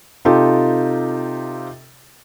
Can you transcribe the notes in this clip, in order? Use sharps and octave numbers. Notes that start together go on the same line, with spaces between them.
C3 D#4 F4 G4 A4